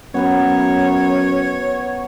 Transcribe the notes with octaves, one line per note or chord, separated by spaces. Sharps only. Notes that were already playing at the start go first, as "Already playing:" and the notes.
F#2 B3 B4 C#5 A#5